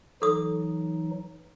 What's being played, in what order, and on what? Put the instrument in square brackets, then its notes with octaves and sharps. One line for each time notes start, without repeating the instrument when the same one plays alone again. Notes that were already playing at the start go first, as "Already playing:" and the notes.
[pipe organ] E3 F#3 D#4 [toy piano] A4 D#6